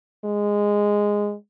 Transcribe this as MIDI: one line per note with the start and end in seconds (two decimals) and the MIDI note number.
0.25 1.34 56